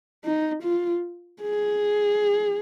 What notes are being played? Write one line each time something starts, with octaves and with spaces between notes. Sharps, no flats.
D#4
F4
G#4